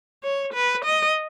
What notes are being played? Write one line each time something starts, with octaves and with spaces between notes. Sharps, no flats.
C#5
B4
D#5